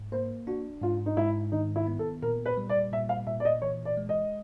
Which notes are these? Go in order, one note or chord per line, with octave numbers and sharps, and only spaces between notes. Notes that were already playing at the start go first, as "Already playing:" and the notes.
Already playing: G#2
A#3 C5
D4 F#4
G#2 F4
D#4
G#2 E4
D#3 D#4
E4
B3
A4
A#2 A#4
B4
G3
D5
A#2 E5
F5
A#2 E5
D5
D#5
E3 C#5
D5
G#3
D#5